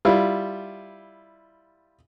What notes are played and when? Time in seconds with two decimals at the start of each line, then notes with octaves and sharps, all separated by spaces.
0.05 G3 E4 F4